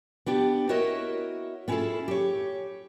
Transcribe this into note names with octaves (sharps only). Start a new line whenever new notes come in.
B3 D4 G4
E4 F#4 A#4 C#5 D#5 E5
B3 C#4 E4 F4 G#4 A4
G4 C#5